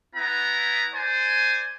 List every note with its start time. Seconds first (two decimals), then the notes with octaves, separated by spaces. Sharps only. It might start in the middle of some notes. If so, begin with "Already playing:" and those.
0.15 B3 E4 A#5
0.94 C5 D5 G#5